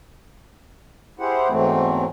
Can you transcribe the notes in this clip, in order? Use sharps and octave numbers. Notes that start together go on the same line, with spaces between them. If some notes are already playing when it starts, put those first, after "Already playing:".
E4 G4 G#4 C5 F#5
E2 G#2 E3 F#3 A3 C4